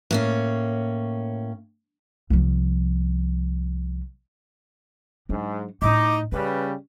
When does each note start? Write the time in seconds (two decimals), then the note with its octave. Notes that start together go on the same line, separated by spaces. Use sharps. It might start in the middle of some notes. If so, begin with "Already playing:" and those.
0.11 A2 A#3 C#4
2.30 C2 F3
5.29 G#2 F#3 D4
5.82 A2 D4 D#4 D6
6.32 C#3 G3 C#4 B4